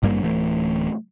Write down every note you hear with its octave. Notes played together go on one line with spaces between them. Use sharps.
G#1 G2 G3 A#3
D1 E3 A3